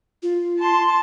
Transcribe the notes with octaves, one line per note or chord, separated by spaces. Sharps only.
F4
A5 C6